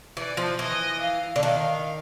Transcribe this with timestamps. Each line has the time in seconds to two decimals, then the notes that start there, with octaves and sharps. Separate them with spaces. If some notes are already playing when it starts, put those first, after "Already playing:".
0.17 E3 D5
0.37 F3
0.58 E3 D#5
1.01 F5
1.36 D3
1.43 D#3 F5